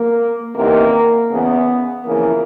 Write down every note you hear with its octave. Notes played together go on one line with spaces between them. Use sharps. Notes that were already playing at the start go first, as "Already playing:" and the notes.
Already playing: A#3
E2 C3 D#3 A#3
E2 C#3 E3 B3
F2 C#3 E3 A#3